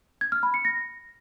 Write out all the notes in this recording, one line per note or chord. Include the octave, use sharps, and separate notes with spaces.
G#6
F6
B5
C#7
A#6